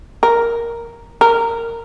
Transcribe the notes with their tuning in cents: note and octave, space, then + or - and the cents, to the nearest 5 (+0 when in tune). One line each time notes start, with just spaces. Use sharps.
A#4 +0
A#4 -15